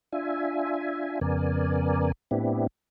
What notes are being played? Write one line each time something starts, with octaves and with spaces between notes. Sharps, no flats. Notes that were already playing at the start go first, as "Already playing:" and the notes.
D4 F4 E5 G#5
F2 C#3 B3 A#4 D5 G#5
A2 B3 C4 D4 E4 G4